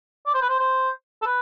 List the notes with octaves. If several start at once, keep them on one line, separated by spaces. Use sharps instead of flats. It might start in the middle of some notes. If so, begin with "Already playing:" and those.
D5
C5
B4
C5
C5
A4
B4